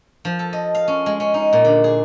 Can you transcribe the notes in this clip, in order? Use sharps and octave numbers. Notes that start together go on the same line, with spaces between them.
F3
A4
D#5
F5
C#4
G#3
C#4
D#4
A#2
D3
G#4